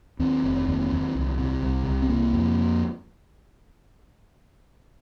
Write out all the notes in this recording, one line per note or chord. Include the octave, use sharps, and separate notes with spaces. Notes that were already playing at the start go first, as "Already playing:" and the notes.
D#2 C4
F1
D#2
D#2
C2
C3
C2
C2
C4
C3 A#3
F2